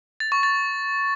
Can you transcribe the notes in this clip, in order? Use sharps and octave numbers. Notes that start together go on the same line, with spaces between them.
A6
C#6
A6